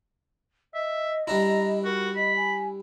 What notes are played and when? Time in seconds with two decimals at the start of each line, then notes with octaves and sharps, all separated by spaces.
0.74 D#5 E5
1.28 G3 D4 E4 A#5
1.85 F#4 A#4
2.16 D#5 B5
2.37 G#5